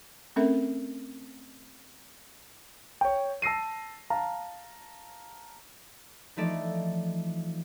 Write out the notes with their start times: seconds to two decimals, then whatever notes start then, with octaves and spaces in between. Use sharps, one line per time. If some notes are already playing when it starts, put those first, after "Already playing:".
0.36 A3 C4 C#4 A4 A#4 E5
3.01 C#5 G5
3.42 A5 E6 A#6 C7 D#7
4.10 F5 A5 A#5
6.36 E3 F3 A3 D#4 A4 D5